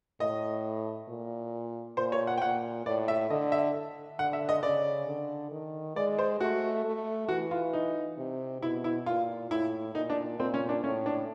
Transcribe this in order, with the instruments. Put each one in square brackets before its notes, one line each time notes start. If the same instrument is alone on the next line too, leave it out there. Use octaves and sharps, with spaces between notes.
[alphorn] A2 [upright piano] D#5
[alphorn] A#2
[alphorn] A#2 [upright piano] C5
[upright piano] C#5
F#5
G5
[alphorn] A#2 [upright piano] F#5
[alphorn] A2 [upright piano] D5
[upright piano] E5
[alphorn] D3 [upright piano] D#5
[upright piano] E5
[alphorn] D3 [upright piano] F#5
[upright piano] E5
D#5
[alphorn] C#3 [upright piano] D5
[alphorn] D3
D#3
[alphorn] G#3 [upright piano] D5
[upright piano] C5
[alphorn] A3 [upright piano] F#4
[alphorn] A3
[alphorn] E3 [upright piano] F#4
[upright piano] F4
D#4
[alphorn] C3
[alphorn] B2 [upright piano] E4
[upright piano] E4
[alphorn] A#2 [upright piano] F4
[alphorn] A2 [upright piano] E4
[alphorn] A#2 [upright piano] D#4
[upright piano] D4
[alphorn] A#2 [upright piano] C4
[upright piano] C#4
D4
[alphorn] A2 [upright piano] C#4
[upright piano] D4